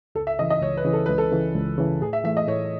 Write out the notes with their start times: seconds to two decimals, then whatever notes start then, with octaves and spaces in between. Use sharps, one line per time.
0.15 C#2 A4
0.27 E5
0.39 C#3 E3 D#5
0.50 D#5
0.62 C#2 C#5
0.77 B4
0.85 C#3 E3
0.93 A4
1.06 C#2 B4
1.18 A4
1.32 C#3 E3
1.55 C#2
1.78 C#3 E3
2.01 A2 G#4
2.13 E5
2.24 E3 A3 E5
2.37 D#5
2.48 A2 C#5